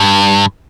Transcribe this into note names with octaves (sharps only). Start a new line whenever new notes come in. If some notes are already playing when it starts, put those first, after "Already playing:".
Already playing: G2